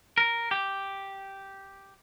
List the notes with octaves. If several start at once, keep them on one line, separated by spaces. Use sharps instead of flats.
A#4
G4